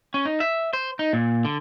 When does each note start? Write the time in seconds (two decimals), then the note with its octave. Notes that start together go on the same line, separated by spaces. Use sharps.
0.14 C#4
0.25 D#4
0.40 E5
0.73 C5
0.99 D#4
1.13 A#2
1.45 D3